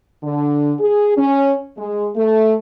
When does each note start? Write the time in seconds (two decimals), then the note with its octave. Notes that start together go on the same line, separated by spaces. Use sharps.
0.23 D3
0.80 G#4
1.17 C#4
1.78 G#3
2.16 A3